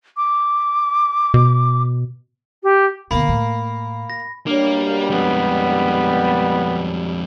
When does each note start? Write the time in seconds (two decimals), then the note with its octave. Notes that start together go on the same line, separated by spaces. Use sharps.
0.17 D6
1.34 B2
2.63 G4
3.11 B2 D3 A#3 B5
3.29 A2
4.10 A#6
4.47 F#2 B2 G3 A#3 D4 C#5
5.10 F2 G#3 B3